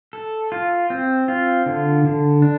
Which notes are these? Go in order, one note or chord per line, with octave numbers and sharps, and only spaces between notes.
A4
F4
C4
F4
D3
D3
D4